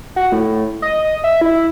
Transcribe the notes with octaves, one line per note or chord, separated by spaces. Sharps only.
F#4
A2
D#5
E5
E4